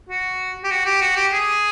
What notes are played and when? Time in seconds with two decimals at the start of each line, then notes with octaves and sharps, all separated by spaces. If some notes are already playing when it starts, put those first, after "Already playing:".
0.09 F#4
0.64 G4
0.71 F#4
0.86 G4
1.01 F#4
1.16 G4
1.32 G#4